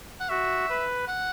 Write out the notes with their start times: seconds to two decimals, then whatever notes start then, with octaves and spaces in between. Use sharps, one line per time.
0.20 F#5
0.29 F#4 E5
0.69 B4
1.08 F#5